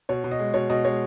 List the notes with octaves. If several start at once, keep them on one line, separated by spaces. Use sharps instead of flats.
B2 C#5
B2
D#5
G#3
B2 C#5
B2 D#5
G#3 C#5